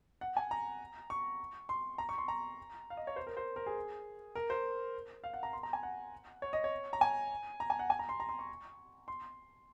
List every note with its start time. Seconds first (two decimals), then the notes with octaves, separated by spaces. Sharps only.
0.21 F#5
0.37 G#5
0.51 A#5
1.10 C#6
1.69 C6
1.98 A#5
2.09 C#6
2.18 C6
2.28 A#5
2.90 F5
2.97 D#5
3.07 C#5
3.16 C5
3.27 A#4
3.37 C5
3.56 A#4
3.66 G#4
4.35 A#4
4.50 C5
5.24 F5
5.33 F#5
5.43 A#5
5.53 C6
5.63 A#5
5.73 G#5
5.83 F#5
6.42 C#5
6.53 D#5
6.64 C#5
6.93 A#5
7.01 G#5
7.60 A#5
7.70 G#5
7.79 F#5
7.90 G#5
7.99 A#5
8.09 C6
8.20 A#5
8.29 C6
8.39 C#6
9.08 C6